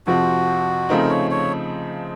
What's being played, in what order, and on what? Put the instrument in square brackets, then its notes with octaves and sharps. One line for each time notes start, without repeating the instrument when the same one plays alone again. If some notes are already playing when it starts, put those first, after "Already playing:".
[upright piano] F2 C3 F3 C4 [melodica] F#4
[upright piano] C#3 F3 A3 C4 D#4 [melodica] A#4
[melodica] C#5
C#5